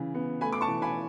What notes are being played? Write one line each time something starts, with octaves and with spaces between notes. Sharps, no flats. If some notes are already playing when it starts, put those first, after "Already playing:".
Already playing: C#3 E3
B3
A3 G#5 B5
D6
A5 C#6
E3
G#5 B5